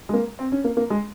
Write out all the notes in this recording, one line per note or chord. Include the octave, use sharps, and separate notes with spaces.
G#3
A#3
C4
C#4
A#3
A#3
G#3